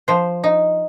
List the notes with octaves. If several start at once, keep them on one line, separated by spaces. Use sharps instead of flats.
F3 C5
D#4